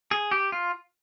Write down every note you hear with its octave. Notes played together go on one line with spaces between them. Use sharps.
G#4
G4
F4